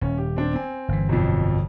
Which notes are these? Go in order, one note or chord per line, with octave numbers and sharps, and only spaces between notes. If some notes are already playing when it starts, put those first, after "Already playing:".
D#1 C#4
G4
C4 D4
C4 G#5
G1 E3
B1 F2